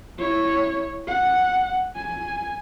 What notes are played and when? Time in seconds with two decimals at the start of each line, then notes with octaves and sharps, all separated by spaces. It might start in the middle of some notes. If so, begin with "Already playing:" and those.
0.18 E4 C#5
1.07 F#5
1.96 G#5